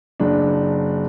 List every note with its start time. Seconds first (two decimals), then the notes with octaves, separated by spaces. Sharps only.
0.20 F#1 D4